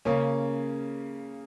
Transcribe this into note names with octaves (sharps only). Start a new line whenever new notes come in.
C#3 A#3 C#4